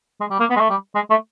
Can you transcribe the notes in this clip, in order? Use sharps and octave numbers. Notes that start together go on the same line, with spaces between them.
G#3
G3
A#3
B3
G#3
A3
G3
G#3
A3